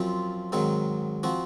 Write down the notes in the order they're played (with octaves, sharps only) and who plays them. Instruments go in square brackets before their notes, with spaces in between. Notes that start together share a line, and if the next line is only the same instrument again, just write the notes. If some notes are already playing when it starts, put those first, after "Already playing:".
Already playing: [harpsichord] F#2 F3 C4 F4
G#2 D#3 F#3 C4
F3 C4 F#4